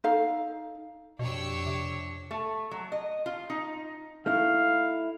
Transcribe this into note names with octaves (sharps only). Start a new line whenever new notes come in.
D#4 A4 F5
F2 B2 D4 G4 C#5 E6
C3
A3
F#3
D#5
F4
D#4
A3 D#4 E4 F5